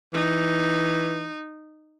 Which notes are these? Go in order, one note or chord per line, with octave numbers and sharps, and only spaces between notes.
E3 D#4